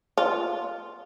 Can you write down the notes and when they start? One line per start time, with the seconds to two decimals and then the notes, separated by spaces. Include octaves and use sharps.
0.18 F4